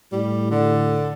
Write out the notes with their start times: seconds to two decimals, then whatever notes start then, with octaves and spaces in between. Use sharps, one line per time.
0.12 A2 G3
0.51 D3